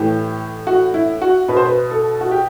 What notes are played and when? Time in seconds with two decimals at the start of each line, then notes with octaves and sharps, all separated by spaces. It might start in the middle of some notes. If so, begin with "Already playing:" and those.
Already playing: A2 E3 G4
0.67 F#4
0.94 E4
1.22 F#4
1.48 B2 B4
1.57 C5
1.65 B4
1.91 A4
2.21 F#4
2.31 G4